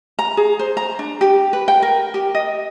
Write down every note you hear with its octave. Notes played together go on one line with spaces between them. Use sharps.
A#5
G#4
C5
A#5
D4
G4
B4
G5
A#4
G4
D#5